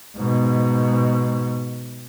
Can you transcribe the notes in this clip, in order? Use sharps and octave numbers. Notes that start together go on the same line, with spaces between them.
G#2 B2